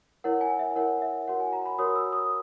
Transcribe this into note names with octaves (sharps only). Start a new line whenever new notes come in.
E4 A#4 C#5 F#5
G#5
E5
E4 A#4 C#5 F#5
E5
F#4 A#4 C#5 F#5
G#5
A#5
B5
F#4 A#4 C#5 D#6
E6
D#6